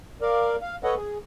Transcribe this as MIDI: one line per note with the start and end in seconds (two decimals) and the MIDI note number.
0.21 0.56 70
0.21 0.56 74
0.21 0.56 77
0.62 0.76 77
0.84 0.95 69
0.84 0.95 71
0.84 0.95 73
0.84 0.95 75
0.84 0.95 78
0.97 1.18 68